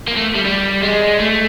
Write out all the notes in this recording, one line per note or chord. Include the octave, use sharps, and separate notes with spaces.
A#3
A3
G3
G3
G#3
A3